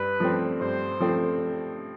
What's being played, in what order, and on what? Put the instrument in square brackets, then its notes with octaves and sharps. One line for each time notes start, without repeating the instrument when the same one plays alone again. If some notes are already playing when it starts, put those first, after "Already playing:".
Already playing: [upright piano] G2 [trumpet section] B4
[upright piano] F3 A3 C4
[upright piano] G2 [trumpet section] C5
[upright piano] F3 A3 C4